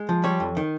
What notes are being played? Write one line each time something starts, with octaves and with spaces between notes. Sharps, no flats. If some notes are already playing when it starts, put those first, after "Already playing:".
Already playing: G#3
F3
G3 C#5
F2
D#3